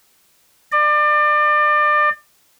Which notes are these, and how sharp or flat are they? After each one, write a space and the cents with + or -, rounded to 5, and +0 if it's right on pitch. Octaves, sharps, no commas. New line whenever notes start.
D5 +30